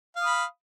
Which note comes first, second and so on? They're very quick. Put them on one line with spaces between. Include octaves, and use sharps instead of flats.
F5 D#6 B5